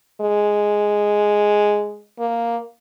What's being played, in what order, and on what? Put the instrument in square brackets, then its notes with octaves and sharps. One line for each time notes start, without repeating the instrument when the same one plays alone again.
[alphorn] G#3
A#3